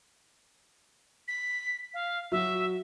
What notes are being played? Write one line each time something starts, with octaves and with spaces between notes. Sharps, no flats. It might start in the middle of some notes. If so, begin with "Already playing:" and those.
B6
F5
F#3 F#4 E5